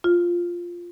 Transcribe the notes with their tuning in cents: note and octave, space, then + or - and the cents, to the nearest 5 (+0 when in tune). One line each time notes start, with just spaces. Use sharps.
F4 +0